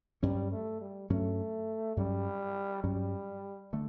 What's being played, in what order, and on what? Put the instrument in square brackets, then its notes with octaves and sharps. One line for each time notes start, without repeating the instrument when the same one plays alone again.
[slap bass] G2 F#3 C#4 [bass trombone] G3
[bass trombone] A3
G3
[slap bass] G2 F#3 C#4 [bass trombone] A3
[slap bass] G2 F#3 C#4 [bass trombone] G3
[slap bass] G2 F#3 C#4 [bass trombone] G3
[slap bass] D3 A3